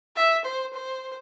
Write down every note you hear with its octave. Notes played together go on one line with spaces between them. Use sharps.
E5
C5
C5